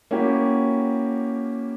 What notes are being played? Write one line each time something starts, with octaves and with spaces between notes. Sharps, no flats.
A#3 C#4 E4 F#4 G4